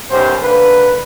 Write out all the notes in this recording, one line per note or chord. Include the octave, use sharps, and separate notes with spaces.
B1 F#2 G4 C5
D3 A#3 B4